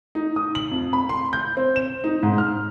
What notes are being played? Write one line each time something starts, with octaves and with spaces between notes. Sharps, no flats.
D#4
D#6
F#7
F2
B5
C6
G6
C4
E7
D#4
G#2
F6